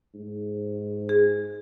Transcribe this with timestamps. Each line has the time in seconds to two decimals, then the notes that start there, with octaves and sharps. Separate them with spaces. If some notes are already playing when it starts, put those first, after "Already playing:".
0.15 G#2
1.09 G#4